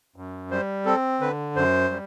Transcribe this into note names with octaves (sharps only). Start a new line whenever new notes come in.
F#2
G3 C5
C4 A4
D3 B4
F#2 C5
G3